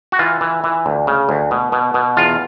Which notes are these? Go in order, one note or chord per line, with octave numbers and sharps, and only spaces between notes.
F#4
E3 F4
E3
E3
D2
C#3
D2
B2
B2
B2
E2 F4